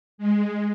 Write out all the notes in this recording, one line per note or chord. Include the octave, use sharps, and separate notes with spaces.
G#3